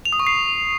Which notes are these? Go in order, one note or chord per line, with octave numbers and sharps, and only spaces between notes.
F7
D#6
C#6
C7